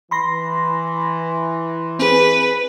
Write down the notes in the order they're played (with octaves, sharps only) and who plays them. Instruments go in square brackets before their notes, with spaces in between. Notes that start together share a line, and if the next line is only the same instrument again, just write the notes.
[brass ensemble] E3 [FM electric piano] B5 C6 A#6
[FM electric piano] C4 G#4 [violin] B4